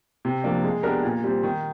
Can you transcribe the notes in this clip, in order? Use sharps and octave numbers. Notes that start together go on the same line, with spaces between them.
C3
F3 A#3 D4
G#3
B3 D4 G4 A#4
A#2
G3 C4
D#3